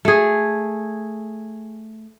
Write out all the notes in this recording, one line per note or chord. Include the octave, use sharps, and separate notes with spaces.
A3 G#4